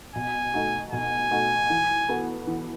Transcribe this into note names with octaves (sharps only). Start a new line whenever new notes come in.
B2 G#5
A3 D#4 F#4
B2 G#5
A3 D#4 F#4
E3
B3 F#4 A4
E3